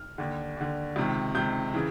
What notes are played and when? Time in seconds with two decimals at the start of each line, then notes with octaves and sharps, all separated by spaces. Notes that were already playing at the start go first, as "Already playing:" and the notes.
Already playing: F6
0.18 D#2 D3
0.57 D#2 D3
0.96 C#2 C3 D#3
1.35 C#2 C3 D#3 G6
1.74 C#3 E3